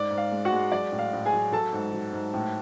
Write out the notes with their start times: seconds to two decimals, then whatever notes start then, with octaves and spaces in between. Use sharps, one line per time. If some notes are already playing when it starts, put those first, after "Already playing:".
Already playing: G#2 D5
0.11 G#2
0.18 F5
0.31 G#3
0.45 F#4 F#5
0.52 G#3
0.72 F#3 D5
0.92 A2
0.99 F5
1.13 A2
1.26 G#4 G#5
1.33 F#3
1.52 F#3 A4 A5
1.73 G#2
1.93 F#3
2.13 G#2
2.34 A2